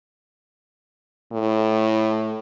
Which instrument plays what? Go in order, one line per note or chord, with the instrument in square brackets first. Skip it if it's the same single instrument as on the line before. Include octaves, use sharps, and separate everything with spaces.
[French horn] A2